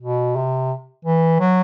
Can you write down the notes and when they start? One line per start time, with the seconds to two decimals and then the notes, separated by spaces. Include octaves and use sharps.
0.01 B2
0.36 C3
1.05 E3
1.40 F#3